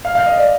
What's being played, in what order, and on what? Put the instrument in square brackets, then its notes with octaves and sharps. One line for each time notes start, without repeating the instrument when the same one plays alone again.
[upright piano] F5
F5
D#5
D5